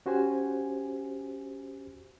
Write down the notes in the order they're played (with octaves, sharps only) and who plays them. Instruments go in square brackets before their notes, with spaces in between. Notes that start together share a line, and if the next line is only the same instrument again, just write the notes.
[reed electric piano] C#4 F#4 G4 C5 G#5